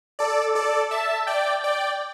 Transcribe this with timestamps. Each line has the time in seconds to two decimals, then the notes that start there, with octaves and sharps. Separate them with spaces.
0.19 A4 D5
0.55 A4 D5
0.91 E5 A5
1.27 D5 G5
1.64 D5 G5